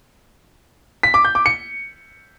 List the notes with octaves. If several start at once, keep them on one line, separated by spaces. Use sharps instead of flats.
B6
D6
G6
D6
C#7